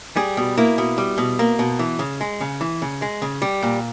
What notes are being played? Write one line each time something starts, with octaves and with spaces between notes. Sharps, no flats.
G3 G#4
B2
A#3 E4
B2
G3
B2
A#3
B2
E3
C#3
G#3
C#3
E3
C#3
G#3
C#3
G3
A#2